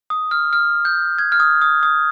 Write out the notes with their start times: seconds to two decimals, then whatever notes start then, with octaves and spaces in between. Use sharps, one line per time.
0.10 D#6
0.31 F6
0.53 F6
0.85 G6
1.18 G#6
1.32 F6
1.40 D#6
1.62 D#6
1.83 D#6